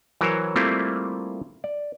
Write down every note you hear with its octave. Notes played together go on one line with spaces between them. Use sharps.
E3 F#3 A#4 C5 C#5
G3 A3 A#3 C4 E4 F4
D5